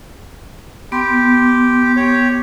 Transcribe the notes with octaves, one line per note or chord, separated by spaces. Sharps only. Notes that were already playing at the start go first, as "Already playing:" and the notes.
B3 G4 C6
G4 C#5